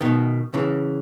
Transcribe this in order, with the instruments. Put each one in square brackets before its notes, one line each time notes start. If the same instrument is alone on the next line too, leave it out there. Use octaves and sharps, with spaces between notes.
[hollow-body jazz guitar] B2 D#3
C#3 E3